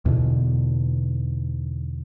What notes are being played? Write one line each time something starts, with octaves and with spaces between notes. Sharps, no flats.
E2 B2 D3